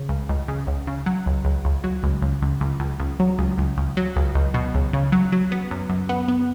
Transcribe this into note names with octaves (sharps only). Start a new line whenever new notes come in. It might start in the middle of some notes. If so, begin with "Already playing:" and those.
Already playing: C#3
C#2
C#2
C#3
C#2
C#3
F#3
C#2
C#2
C#2
F#3
C#2
C#2
C#2
C#2
C#2
C#2
F#3
C#2
C#2
C#2
F#3
C#2
C#2
B2
C#2
C#3
F#3
F#3
B3
F#2
F#2
B3
B3